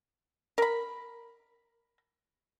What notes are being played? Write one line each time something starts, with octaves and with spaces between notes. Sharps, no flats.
A#4 B5